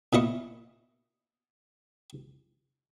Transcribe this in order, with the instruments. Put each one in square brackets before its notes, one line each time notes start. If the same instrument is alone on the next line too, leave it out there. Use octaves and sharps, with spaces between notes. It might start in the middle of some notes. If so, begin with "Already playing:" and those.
[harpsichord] A#2 E4 D#5 C#6